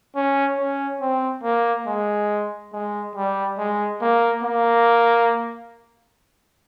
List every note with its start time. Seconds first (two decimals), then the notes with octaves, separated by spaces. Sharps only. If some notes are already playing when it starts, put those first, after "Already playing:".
0.16 C#4
0.58 C#4
1.01 C4
1.43 A#3
1.87 G#3
2.73 G#3
3.16 G3
3.58 G#3
4.02 A#3
4.43 A#3